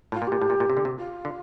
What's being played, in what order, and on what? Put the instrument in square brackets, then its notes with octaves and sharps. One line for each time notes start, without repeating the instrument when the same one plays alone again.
[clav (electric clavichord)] A2 [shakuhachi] F4
[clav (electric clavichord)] A#2
[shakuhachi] G4
[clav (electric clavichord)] A#2
A2
A#2
A#2
C3
D3
C3
[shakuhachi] F4
[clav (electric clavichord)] D3